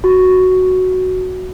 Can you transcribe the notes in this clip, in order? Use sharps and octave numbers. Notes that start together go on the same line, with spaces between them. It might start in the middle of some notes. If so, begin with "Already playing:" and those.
F#4